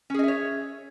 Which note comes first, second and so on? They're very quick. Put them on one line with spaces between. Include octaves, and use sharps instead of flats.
C#4 G#4 D#5 E5 C#5